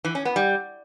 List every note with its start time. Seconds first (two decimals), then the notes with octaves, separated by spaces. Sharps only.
0.05 E3
0.15 C#4
0.25 B3
0.36 G3